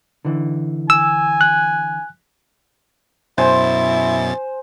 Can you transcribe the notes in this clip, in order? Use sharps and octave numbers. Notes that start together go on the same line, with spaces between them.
D3 E3
G#5 E6
F#6
F#2 B2 E4 C5 G#5 A6